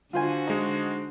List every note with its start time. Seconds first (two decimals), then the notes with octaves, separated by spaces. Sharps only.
0.13 D3 F4 F#4 C5 G#5
0.47 G#3 D#4